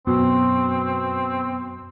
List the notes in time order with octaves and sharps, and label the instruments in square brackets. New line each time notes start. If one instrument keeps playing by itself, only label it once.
[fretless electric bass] F#2 [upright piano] B2 [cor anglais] C4